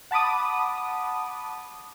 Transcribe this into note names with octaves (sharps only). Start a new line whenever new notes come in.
F#5 A5 B5 D6 D#6